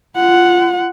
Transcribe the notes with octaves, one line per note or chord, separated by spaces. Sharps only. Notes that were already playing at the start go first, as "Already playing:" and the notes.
F4 F#5